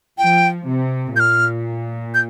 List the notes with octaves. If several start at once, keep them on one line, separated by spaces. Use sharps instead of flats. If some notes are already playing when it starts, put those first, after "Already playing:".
F3 G5
C3
A#2 F6 G6
G6